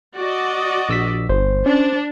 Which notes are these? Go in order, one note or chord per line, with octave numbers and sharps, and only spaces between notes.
F#4 D5 D#5
A#1 E6 B6
G1 C5
C#4 D4